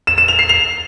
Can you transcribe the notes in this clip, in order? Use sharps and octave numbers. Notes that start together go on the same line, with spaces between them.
E7
E7
F7
C7
F7